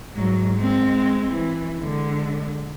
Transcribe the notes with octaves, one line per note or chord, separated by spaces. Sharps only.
G#2 F#3
G#3 C4
E3
D3 G#3